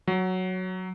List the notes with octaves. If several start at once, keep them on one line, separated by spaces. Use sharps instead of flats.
F#3